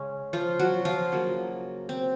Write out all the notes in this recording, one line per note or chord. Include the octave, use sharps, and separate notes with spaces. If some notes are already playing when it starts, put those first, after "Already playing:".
Already playing: C#3 G#3 C#4
F3 F4
F#3 F#4
F3 F4
C#3 F#3 A#3
C4